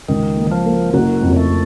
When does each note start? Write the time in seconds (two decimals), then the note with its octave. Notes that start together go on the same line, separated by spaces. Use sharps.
0.08 C#2 D#3
0.37 A#3
0.52 F3
0.66 A#3
0.94 F#1 F#3
1.22 F2
1.37 A3